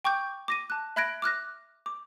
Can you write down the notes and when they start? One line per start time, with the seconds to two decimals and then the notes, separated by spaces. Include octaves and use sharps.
0.04 G5 C#6 D6 G6
0.48 D6 A#6 D#7
0.70 A5 F#6
0.96 E5 B5 F#6 G#6 A#6 D7
1.22 D6 F6 F#6 A#6
1.86 D6